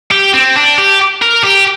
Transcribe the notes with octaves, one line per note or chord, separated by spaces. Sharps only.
G4
C4
D4
G4
A#4
G4